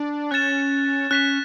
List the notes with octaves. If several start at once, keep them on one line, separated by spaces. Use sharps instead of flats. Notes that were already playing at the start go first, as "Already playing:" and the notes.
Already playing: D4
C#4 F#6 A6 E7
C#4 F#6 B6 E7